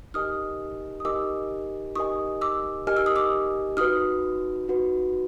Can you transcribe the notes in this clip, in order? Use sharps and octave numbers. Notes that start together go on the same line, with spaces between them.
D#4 G4 A#4 D#5 G#5 D#6 F6
D#6
D#4 G4 A#4 D#5 G#5 D6 E6
D#4 G4 A#4 D#5 G#5 C#6 D#6
D6 E6
D#4 G4 A#4 D#5 G#5 F6
E6
D#6
D6 E6
D#4 F#4 B4 D#6 F6
D#4 F#4 B4